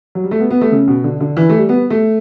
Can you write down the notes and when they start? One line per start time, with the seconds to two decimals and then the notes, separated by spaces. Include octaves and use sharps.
0.15 F#3
0.24 G3
0.31 A3
0.40 B3
0.51 B3
0.61 A3
0.72 C#3
0.88 B2
1.04 D3
1.21 D3
1.37 E3
1.50 A3
1.58 G3
1.69 B3
1.91 A3